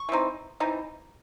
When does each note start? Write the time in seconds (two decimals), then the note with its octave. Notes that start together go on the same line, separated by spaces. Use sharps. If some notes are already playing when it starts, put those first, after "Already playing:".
Already playing: C#6
0.09 E3 C4 D#4
0.60 E3 C4 D#4